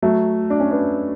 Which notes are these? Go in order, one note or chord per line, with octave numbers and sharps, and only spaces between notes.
F#3 A3
D4
C#4
B3 D4